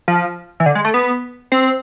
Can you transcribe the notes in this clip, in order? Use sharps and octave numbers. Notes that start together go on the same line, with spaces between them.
F3
E3
D3
G#3
A3
B3
C4